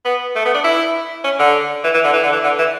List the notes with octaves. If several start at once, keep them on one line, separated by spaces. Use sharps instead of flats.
B3
A3
B3
D4
E4
C#4
D3
E3
E3
D3
E3
D3
E3
D3
E3